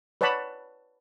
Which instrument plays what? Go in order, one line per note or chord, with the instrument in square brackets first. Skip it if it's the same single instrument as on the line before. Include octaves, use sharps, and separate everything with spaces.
[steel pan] B4 C#5 D5 F#5 A5 B5